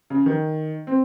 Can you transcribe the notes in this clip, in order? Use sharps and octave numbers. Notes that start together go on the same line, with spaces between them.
C#3
D#3
C4